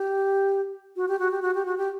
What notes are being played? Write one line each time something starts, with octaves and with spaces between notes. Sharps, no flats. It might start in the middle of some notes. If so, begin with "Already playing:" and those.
Already playing: G4
F#4
G4
F#4
G4
F#4
G4
F#4
G4